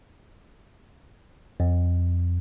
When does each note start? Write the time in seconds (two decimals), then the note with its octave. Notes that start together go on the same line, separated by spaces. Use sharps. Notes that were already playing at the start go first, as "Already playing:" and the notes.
1.60 F2